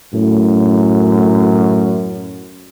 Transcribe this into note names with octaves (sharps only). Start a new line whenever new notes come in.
F#2 A2